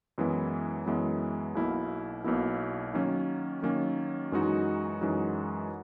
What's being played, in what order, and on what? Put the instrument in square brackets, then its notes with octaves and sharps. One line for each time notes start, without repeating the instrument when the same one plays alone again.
[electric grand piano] F#2 E3 G#3 B3 E4
F#2 E3 G#3 B3 E4
B1 B2 A#3 E4
B1 B2 A#3 E4
D#3 F#3 A#3 C#4
D#3 F#3 A#3 C#4
F#2 E3 G#3 D#4 F#4
F#2 E3 G#3 D#4 F#4